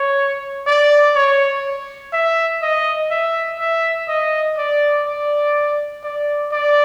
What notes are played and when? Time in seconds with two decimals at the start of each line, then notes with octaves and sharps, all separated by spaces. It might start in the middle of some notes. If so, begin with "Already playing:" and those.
Already playing: C#5
0.67 D5
1.16 C#5
2.13 E5
2.62 D#5
3.11 E5
3.59 E5
4.08 D#5
4.58 D5
5.06 D5
6.04 D5
6.52 D5